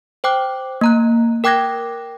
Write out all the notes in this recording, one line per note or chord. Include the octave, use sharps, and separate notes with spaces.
C5 G5 D6 F#6
A#3 A#5 F#6
A#4 G5 D6 F#6 G#6 A#6